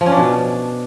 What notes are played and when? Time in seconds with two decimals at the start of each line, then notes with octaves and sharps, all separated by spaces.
0.01 F3
0.06 C#4
0.12 D4
0.17 B2